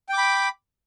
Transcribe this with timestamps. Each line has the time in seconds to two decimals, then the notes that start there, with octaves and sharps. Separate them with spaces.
0.09 G5
0.13 D6
0.18 B5